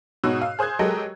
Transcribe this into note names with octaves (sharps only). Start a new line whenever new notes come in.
G#2 B2 F#4 C#5 E6 F#6
F5
G#4 C5 D#6 F#6 G#6
F#3 G#3 G4 A4 A#4 D#5